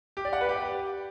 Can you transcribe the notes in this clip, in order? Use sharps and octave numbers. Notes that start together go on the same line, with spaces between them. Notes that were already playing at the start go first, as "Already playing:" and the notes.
G4
D5
F#5
B4
G4